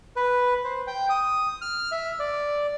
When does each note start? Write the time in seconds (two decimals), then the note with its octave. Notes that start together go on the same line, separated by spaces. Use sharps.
0.16 B4
0.64 C5
0.87 G5
1.09 D#6
1.61 F6
1.92 E5
2.20 D5